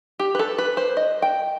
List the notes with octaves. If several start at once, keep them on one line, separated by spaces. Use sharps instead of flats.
G4
B4
A4
B4
C5
D#5
G5